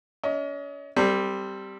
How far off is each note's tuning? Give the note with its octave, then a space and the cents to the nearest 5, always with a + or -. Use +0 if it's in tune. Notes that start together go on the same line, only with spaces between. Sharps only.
C#4 +40 D#5 +30
G3 +0 C4 +0 A4 +45